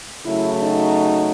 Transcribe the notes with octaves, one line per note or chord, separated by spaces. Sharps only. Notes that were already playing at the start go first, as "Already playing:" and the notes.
C#3 F#3 A3 E4
D#4 F#4